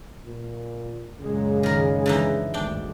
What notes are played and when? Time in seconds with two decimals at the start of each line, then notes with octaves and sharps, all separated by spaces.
0.25 A#2
1.20 F#2 A#2 C#3 G#3
1.63 D#3 A#4
2.06 D3 E3 D#4
2.54 G#1 D2 G2 D4 G5